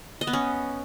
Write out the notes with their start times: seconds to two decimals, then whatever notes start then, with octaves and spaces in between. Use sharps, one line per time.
0.21 D#5
0.27 B3
0.33 C#4